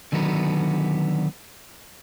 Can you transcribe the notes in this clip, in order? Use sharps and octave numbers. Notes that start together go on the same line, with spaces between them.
D3 D#3 F#3 B3